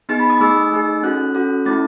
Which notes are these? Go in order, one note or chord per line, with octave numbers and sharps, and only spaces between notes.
B3 D#4 G#4 A6
B5
D#6
A3 D#4 G#4 E6
A3 D#4 G#4
C#4 F#4 A4 F#6
C#4 F#4 A4
A3 C#4 E4 A4 A6